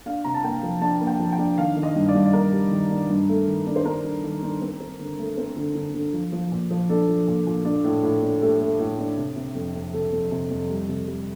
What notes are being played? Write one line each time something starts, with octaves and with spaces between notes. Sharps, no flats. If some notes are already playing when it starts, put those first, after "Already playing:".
D4 F5
C3 A#5
A5
A#3 G5
F3
D4 A5
A#3
G5
F3
G5
D4
D#3 F5
D#3
D#5
G2
D5
G2 D#5
D5
G2 A#4
G3
D#3
D4
G2
A3
D#3
D4
C5
D4 A#4
D4
D#3
D4
C4
C4
D3
A3
C4
D3
D3
D3
F3
F3
A#2
F3
D4 A4
F3
A#2
A#2
D4
A2
A2
D4
A3 G4
A3
A2
D4
C3
C3
F2
F2
C3 A4
F2
C3
F2
G3
C3
G3